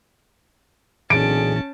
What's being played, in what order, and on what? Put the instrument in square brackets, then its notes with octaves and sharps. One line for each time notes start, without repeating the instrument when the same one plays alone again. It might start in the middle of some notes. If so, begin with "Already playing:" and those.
[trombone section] B1 D3 G#4 [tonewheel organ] A#2 E3 [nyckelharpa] C#4 A5 [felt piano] D7